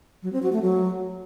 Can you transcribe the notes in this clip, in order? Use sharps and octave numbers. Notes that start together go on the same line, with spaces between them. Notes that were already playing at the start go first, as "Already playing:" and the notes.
F#3
C4
F#4
A3
F#3